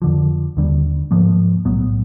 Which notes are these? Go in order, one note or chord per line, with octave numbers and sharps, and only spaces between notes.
F2 D3 F3
D#2 D3 G3
G#2 F3 A#3
B1 A2 F#3 B3